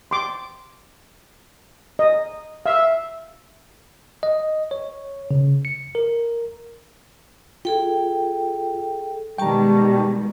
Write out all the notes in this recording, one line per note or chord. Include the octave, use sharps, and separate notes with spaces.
C6 D6
D#5
E5 F5
D#5
C#5
C#3
C#7
A#4
F4 G#4 A4 G5
B2 D#3 G3 G#3 G5 A5 A#5 C#6